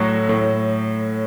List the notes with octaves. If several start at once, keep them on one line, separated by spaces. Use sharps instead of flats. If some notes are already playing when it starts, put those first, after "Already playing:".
Already playing: A2 F#3
A2